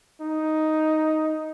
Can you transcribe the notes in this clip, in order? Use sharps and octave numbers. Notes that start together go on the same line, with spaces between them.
D#4